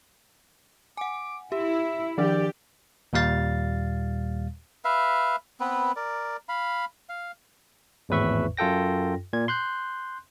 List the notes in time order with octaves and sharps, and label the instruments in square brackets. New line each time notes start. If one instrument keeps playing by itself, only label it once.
[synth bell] F#5 G#5 [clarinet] D6
[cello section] E4 [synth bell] G4 [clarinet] E5
[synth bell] D#3 F3 D4 [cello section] G4 [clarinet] D5
[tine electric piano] D#2 A#2 G3 F5 A6
[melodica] B4 E5 F5
B3 C4 B4
A#4 D5
F5 B5
F5
[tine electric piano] G#1 E2 A2 B4 E5 C#6
F#2 F4 A4 G5 A#6
A#2 G#6
C6 F#6 G6